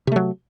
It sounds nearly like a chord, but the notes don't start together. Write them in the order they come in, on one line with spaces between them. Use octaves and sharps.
C3 A3 F#3